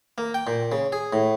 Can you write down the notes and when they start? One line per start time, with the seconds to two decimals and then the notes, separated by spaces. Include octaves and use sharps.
0.18 A#3
0.34 G5
0.47 A#2
0.72 C#3
0.92 G#4
1.13 A2